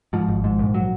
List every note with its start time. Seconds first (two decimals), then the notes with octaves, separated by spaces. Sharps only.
0.13 G#2 F3
0.28 G#1
0.44 G#2
0.59 A#1
0.74 F#3